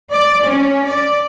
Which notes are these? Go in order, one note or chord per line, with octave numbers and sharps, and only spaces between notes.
D5
C#4
D5